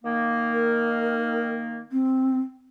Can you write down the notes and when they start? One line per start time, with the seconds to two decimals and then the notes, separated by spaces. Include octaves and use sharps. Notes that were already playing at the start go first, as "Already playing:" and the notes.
0.04 D#3 A#3
0.53 A#4
1.91 C4